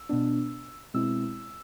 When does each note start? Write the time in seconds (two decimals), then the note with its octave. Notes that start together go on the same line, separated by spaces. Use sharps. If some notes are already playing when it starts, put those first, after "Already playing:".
Already playing: E6
0.09 B2 B3 D4
0.94 B2 G#3 C4 E4 E6